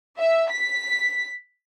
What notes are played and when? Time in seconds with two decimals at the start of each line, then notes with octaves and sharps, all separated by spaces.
0.17 E5
0.51 B6